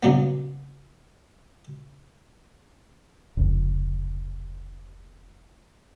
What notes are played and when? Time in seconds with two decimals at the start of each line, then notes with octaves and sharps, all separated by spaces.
0.03 G2 C#3 F#3 A#3 B3
3.37 F1 C#2